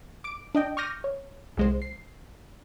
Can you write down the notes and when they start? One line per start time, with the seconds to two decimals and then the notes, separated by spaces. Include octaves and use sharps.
0.24 D6 D7
0.55 D4 D#5 G5
0.77 C#6 D6 F6 G6 A#6 D#7
1.04 C#5
1.57 C2 G#3 C5
1.82 C7